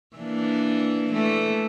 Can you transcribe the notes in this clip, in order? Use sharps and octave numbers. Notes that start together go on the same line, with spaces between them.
E3 A#3 D4
E3 A3